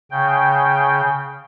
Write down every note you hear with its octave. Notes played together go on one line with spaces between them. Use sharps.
C#3 G5